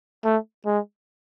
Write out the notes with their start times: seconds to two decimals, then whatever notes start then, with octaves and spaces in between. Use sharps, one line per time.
0.24 A3
0.66 G#3